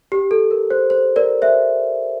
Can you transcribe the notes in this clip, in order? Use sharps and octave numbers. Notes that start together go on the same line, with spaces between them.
G4
A4
A#4
C5
C5
A#4 D5
C5 E5